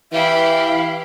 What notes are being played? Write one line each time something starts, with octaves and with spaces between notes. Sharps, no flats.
E3 E4 G4 E5 F5